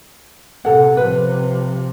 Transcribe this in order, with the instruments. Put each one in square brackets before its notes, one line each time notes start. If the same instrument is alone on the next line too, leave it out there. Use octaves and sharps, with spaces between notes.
[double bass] C3 [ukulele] A4 F#5
[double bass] C3 F3 [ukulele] B4